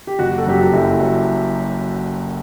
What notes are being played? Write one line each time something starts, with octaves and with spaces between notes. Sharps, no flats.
G4
F#1 F#4
A4
F#2 F#3 G4
F#4
F#1 E4
F#3